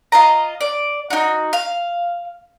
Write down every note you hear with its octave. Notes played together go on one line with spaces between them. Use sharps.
F4 D#5 A#5
D5
D#4 F#4
F5